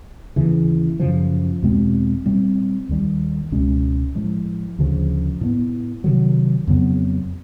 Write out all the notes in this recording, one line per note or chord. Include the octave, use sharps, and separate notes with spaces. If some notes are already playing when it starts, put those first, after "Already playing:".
D#2 C#3 E3
F#2 C#3 F3
E2 B2 G#3 C4
A#2 G3 C4
D#2 D#3 G3
C#2 B2 G#3 C#4
A2 F3 G#3
D2 C#3 F3
A2 F#3 B3
C3 D#3 F#3
F2 C#3 F#3 B3